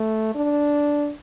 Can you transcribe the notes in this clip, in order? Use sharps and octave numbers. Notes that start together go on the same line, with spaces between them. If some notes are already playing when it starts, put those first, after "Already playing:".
Already playing: A3
D4